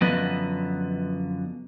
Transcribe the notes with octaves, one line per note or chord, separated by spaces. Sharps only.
F#2 D3 F3 B3 B4 D#5